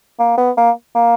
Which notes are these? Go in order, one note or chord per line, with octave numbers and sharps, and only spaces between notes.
A#3
B3
A#3
A#3